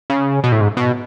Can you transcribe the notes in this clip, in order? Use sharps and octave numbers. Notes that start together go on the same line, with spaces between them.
C#3
B2
A2
G#2
B2